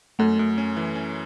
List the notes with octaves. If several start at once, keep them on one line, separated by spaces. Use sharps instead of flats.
F#2 A3 A4
F#2
C#4
E3
C#4